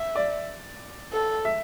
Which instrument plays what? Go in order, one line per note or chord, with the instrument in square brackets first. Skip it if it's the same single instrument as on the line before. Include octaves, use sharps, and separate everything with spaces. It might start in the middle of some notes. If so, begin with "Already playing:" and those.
Already playing: [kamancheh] E5
[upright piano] D5
[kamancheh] A4
[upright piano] E5